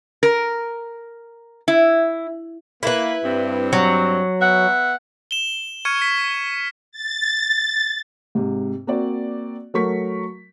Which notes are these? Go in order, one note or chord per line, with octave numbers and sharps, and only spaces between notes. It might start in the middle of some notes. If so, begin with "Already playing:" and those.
A#4
E4
A#3 E4 B4
G2 C4
F#3
B3 E5 F#5
E7 G7
C#6 F6 G#6 C#7 D#7
B6
A6
G#2 C3
A#3 C4 F#4 D5
F#3 A3 A#4 C#6 B6